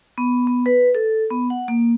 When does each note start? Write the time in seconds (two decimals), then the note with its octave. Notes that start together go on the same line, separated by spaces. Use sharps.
0.18 B3
0.47 B3
0.66 B4
0.95 A4
1.30 B3
1.50 F#5
1.68 A#3